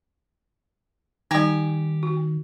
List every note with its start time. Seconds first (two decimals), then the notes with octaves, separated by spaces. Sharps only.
1.31 D#3 G3 D#4 G4 G#5
2.03 F#4